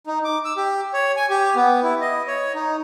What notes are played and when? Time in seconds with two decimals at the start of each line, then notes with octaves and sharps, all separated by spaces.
0.07 D#4
0.25 D6
0.45 E6
0.57 G4
0.94 C#5
1.16 G#5
1.30 G4
1.56 B3
1.83 E4
2.01 D#5
2.27 C#5
2.55 D#4